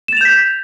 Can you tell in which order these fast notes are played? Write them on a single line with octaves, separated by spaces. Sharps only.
E7 A6 F7 G6 B6